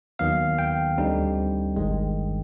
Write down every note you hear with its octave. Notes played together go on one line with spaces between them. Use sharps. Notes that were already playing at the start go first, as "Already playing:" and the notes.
D#2 D#3 F#3 B3 F5
G5
D2 D3 G3 C4 D#4
G1 G2 D#3 G#3